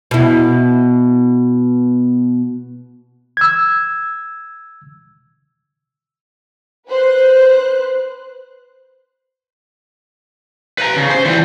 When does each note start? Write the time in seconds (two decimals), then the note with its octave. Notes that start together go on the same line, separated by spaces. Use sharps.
0.11 B2 E4
3.37 E6 G#6
6.88 B4 C5 F#6
10.78 B4 A#5
10.96 C#3
11.10 C5
11.25 E3 G3